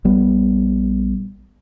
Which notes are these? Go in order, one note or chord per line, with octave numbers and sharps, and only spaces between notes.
A#1 G3 B3